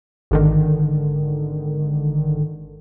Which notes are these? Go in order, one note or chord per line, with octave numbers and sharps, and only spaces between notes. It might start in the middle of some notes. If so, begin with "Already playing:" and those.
G#1 D3 D#3